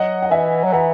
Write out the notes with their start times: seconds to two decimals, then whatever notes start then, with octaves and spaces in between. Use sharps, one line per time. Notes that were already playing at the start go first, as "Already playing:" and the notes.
Already playing: F#3 D#5 F#5
0.23 F#5
0.31 E3 E5 G#5
0.64 F#3
0.73 E3 F#5 A#5